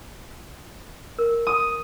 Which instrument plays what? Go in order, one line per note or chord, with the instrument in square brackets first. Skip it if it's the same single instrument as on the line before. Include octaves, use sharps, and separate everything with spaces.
[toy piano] A#4
[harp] D#6